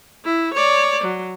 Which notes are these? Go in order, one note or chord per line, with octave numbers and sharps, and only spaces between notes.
E4
C#5 D5
F#3